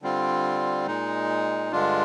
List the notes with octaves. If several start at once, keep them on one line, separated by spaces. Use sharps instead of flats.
D3 G3 C4 F4
A#2 G#3 D#4
G2 D3 G#3 D4 F4